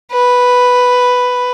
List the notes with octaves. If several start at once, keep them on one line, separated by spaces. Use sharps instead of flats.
B4